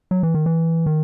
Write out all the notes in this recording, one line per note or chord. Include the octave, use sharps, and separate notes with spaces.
F#3
E3
D#3
E3
D#3